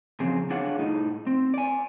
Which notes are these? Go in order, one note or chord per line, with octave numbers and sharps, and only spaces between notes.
C#3 F3 F#3 C4 G#4
D4 F4 G#4 C#5 F5 F#5
A2 D#4
C4
D5 G#5